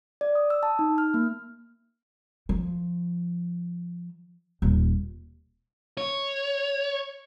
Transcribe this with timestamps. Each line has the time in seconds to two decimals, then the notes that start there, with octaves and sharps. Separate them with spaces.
0.21 D5
0.35 D#6
0.50 E6
0.63 A5
0.79 D#4
0.98 F6
1.14 A#3
2.49 F3
4.62 D#1
5.98 C#5